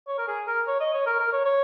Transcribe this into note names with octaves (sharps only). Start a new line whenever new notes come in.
C#5
A#4
G#4
A#4
C#5
D#5
C#5
A#4
A#4
C#5
C#5